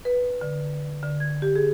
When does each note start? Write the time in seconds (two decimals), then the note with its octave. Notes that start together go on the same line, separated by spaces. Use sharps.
0.05 B4
0.41 D3
1.03 D3
1.20 G#6
1.42 G4
1.56 G#4